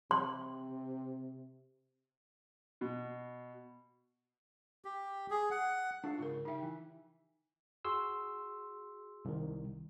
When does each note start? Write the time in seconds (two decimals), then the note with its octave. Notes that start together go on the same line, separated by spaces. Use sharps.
0.11 C3 C6
2.81 B2
4.85 G4
5.31 G#4
5.51 F#5
6.04 D4 F4 A4 F5
6.18 G#2 C#3 F4 A#4
6.45 C#3 D#4 G4 E5
6.62 E3
7.85 F#4 G#4 C6 E6
9.25 C2 D#3